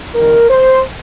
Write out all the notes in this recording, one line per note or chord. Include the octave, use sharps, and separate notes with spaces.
F2 D#3 G3 A#3 A#4
C5